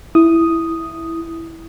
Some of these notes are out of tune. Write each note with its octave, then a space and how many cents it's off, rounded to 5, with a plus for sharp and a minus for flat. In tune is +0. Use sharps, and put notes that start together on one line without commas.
E4 +0 D#6 +0